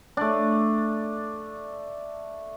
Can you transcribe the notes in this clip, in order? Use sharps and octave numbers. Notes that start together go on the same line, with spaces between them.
A3 D4